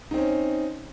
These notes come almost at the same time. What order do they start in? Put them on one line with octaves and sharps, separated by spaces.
D#4 C4 C#4